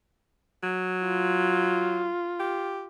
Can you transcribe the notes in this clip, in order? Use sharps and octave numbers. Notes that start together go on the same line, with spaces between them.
F#3
F4
G4